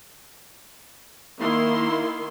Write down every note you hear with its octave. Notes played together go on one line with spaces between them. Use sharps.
D#3 A#3 E4 C6